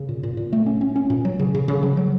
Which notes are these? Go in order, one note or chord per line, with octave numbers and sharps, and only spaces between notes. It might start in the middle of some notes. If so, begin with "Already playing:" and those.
Already playing: C#3
A#2
A#2
A#2
A3
C#4
C#4
C#4
A#2
F#3
C#3
C#3
C#3
F#3
F#3